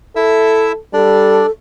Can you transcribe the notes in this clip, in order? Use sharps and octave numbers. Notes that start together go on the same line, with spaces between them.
E4 A4 E5 E6
G3 D4 A4 D5